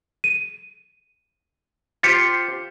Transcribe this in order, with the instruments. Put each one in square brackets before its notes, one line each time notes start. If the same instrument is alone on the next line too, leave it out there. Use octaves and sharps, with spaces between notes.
[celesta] D#7
[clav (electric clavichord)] F4 G4 C5 [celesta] A6 B6 C#7